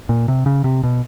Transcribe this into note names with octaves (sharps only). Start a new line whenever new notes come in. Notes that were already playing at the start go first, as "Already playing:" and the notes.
A#2
C3
C#3
C3
B2